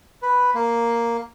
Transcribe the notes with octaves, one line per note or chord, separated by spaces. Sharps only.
B4
A#3